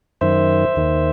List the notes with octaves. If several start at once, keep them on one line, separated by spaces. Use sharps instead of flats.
F#2 D#3 C5 E5
D#2 D#3